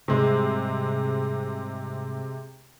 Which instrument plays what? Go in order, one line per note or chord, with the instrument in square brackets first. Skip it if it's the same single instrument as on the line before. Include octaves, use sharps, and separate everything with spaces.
[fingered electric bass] G#2 G3 [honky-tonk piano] C3 G#3